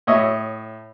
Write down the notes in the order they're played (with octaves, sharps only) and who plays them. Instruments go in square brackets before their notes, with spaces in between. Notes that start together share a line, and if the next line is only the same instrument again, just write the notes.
[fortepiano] A2 C#5 D#5 E5 D#6